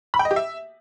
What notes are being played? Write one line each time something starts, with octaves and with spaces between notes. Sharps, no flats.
B5
G5
D#5
G4
E5